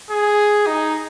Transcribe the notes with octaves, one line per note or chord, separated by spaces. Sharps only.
G#4
D#4